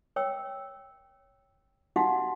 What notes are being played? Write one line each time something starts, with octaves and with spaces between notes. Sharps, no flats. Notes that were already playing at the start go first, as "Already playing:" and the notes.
C#5 G5 E6
D#4 E4 F#4 G4 F5 F#5